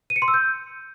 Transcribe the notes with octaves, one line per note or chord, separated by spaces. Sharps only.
D#7
C#7
C6
E6
G6